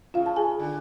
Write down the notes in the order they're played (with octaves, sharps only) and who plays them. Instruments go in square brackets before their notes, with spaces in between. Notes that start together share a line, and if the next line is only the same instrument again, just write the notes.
[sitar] C#3 [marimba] F4 F5
[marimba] A5
G#4 G#5
[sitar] D3